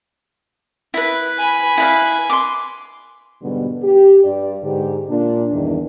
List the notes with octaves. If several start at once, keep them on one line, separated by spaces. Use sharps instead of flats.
E4 B4
G#5 B5
E4 B4 F5
C6 D6
G#2 B2 D3 G3 B3 D4
G4
G2 D5
G#2 D3 G4
A#2 D4
E2 G2 D#3